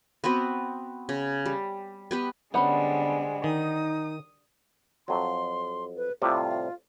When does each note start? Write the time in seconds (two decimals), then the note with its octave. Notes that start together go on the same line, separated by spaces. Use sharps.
0.24 B3 C4 F#4 B4
1.09 C#3
1.45 G3
2.11 B3 G4 B4
2.54 D3 G3 G#3 B3 C#4 C5 F#5 B5
3.44 D#3 D#4 D#6
5.08 F2 F#3 C6
5.96 B4
6.22 A2 C3 G3 F4